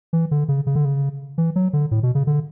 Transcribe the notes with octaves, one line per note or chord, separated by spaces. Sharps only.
E3
D3
C#3
C#3
D3
C#3
E3
F#3
D3
A2
B2
C#3
D3